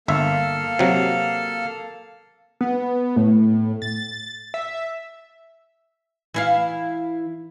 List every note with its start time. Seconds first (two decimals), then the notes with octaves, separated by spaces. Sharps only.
0.08 G1 A#3 A4 E5 F5
0.79 C3 F#3
2.61 B3
3.16 A2
3.82 A6
4.54 E5
6.34 E3 E4 F5